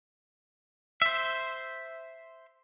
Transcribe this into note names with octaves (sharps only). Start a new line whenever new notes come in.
C5 E5